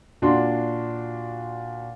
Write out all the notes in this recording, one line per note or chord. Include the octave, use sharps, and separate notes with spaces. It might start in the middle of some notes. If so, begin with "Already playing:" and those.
A#2 D4 F#4 C6